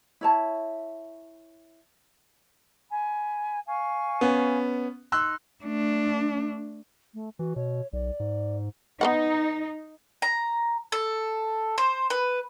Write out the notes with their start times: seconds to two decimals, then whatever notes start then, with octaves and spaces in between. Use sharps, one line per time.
0.21 E4 C#5 A5
2.90 G#5 B5
3.66 F5 G#5 C#6
4.21 B3 C#4
5.12 D#4 C6 E6 F#6
5.64 A3 D4
7.14 A3
7.39 E3 F#4
7.56 B2 C#5
7.93 B1 D5
8.20 G#2
9.01 B3 D#4 B4 F#5
10.22 A#5
10.92 A4
11.78 C5
12.10 B4